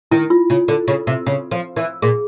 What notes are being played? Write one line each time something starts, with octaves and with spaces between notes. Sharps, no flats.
D#3 E4
F4
C#3
D3
C#3
C3
C#3
F3
E3
A#2 G#4